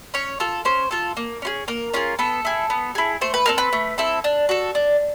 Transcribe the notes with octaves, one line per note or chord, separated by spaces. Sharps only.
C#4 C#5
F4 A4
C#4 C5
F4 A4
A#3
C#4 F4 G#4
A#3 A#4
C#4 F4 G#4
B3 A4
E4 G#4
B3
E4 G#4
A3 C5
B4
C4 E4 A4 A#4
B4
A3
C4 E4 A4
D4
F#4 A4
D4